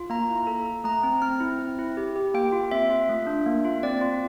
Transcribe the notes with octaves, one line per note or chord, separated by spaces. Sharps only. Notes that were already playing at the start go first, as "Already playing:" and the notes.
Already playing: F4
A#3 A#5
E4
A4
A4
A3 A#5
C4
C4 F6
E4
C4
E4
G4
G4
A#3 G5
F4
C4 E5
F4
A3
D4
A#3
F4
C4 D5
F4